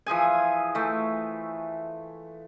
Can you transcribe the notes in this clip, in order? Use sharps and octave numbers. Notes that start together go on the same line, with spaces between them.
E3 F3 G#4 G#5
E3 A3